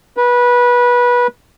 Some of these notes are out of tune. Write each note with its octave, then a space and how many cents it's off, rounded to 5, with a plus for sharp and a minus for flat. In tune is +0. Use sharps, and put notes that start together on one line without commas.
B4 -20